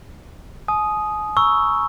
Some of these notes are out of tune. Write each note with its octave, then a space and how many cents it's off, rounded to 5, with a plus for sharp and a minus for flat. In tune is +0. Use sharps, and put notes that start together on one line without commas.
G#5 +40 D#6 +0
A#5 +35 C#6 +0 E6 +0